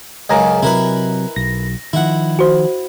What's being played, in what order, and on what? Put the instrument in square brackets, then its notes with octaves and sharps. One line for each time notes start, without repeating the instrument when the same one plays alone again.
[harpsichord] C#2 F#2 C#3 [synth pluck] D#5 G#5 A#5
[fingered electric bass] C3 F#3 [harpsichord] E4 A#4 B4
[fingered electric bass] B1 [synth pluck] A#6
[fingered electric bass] D#3 F3 [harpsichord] E4 F#5
[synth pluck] F#4 C5